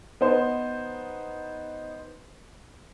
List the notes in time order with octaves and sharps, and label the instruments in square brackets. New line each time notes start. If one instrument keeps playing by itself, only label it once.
[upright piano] B3 D#4 C5